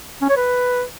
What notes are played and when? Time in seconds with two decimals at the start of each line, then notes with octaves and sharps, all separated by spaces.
0.22 C#4
0.29 C#5
0.37 B4